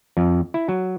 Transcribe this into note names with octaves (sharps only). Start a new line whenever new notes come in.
F2
E4
F#3